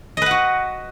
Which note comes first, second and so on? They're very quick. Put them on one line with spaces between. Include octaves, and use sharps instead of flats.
D#5 B4 F#5 F#4